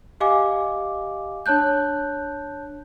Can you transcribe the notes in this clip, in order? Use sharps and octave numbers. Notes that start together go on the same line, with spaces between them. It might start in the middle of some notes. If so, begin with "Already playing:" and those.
G4 D#5 F5 G#5 D6
D4 C#5 A5 F#6 G6